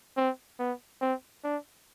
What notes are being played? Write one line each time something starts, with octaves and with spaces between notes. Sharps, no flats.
C4
B3
C4
D4